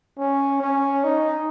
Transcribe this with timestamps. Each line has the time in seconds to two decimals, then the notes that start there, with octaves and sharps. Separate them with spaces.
0.18 C#4
0.61 C#4
1.04 D#4